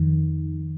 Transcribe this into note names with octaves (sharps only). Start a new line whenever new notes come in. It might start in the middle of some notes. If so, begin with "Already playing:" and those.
Already playing: F2 D#3